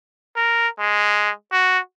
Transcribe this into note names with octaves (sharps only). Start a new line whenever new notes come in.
A#4
G#3
F#4